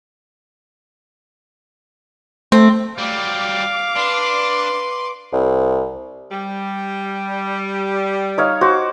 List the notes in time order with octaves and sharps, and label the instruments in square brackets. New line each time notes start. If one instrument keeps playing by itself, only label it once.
[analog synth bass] A3 [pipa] C4
[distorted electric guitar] F#3 G3 [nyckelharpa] F5 [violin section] D6
[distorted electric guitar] D4 [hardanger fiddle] B4 C6
[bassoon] C2
[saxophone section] G3
[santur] D#4 C#5 F5
F#4 C5 D6